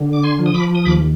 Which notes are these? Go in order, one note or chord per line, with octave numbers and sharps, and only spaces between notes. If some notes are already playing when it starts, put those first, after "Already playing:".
Already playing: D3
D6
G#5 C6
F3
D#6
B5 D6
D#6
D#2 B5 D6